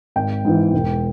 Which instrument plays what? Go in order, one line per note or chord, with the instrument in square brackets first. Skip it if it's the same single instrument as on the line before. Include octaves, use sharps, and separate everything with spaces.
[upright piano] G#1 G5
G#2 E3
E1